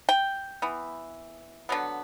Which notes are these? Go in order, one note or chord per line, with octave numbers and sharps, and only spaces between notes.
G5
E3 B3
D3 F#3 B3